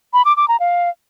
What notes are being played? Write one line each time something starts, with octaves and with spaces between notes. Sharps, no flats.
B5
D6
D6
A#5
F5